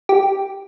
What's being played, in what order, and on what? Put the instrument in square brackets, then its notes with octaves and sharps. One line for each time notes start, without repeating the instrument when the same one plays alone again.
[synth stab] G4